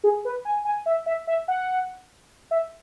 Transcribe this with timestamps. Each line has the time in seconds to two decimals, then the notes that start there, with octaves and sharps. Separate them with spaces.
0.04 G#4
0.25 B4
0.45 G#5
0.65 G#5
0.86 E5
1.06 E5
1.27 E5
1.48 F#5
2.51 E5